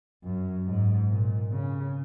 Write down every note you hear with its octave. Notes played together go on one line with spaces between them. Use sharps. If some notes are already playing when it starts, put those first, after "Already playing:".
F#2
G#2
A#2
C#3